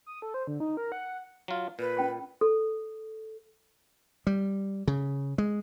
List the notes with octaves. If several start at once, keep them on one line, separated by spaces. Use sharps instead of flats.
D#6
A4
C5
D3
D#4
A#4
F#5
F#3 F4
A#2 B4
C#4 G5 B5
A4
G3
C#3
G#3